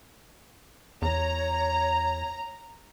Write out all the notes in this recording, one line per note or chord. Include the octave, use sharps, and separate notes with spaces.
E2 C#5 A#5